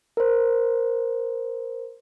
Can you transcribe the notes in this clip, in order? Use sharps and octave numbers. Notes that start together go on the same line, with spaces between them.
A#4 C5